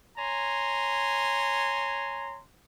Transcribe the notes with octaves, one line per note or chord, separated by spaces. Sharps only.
C#5 G#5 A#5 C6